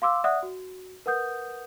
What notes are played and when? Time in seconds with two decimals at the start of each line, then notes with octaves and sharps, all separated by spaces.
0.02 F5 C6 D6 E6
0.24 D5 E5 F#5 D#6 F#6
0.43 F#4
1.06 A#4 B4 F#5 D#6 G6